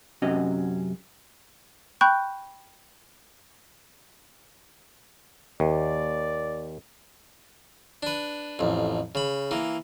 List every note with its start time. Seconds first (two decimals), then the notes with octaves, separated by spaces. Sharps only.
0.22 F#2 C3 C#4 F#4 D#5
2.01 G5 B5 C#6 F#6 G6
5.60 D#2 D5
8.03 D4 B4
8.59 A1 F2
9.15 C#3 B5
9.51 E3 A#3